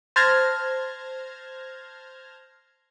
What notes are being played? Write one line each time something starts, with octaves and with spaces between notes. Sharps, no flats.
C5 A5 F6 G#6 A#6